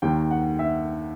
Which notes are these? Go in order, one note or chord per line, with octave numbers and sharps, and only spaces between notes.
D#2 D#3 G5
F#5
E5